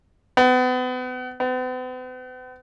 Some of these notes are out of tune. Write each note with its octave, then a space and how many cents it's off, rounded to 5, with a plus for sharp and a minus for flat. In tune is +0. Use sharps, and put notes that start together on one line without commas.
B3 +35
B3 +45